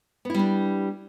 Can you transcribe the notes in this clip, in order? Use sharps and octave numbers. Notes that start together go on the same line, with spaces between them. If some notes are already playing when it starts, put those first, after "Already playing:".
G3 B3 D4 E4